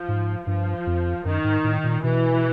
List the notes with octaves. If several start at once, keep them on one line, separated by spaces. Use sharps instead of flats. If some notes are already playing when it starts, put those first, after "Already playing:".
Already playing: F3
G#2
G2 F3
F2
F#2 D#3
G#2
A2
A#2
B2 E3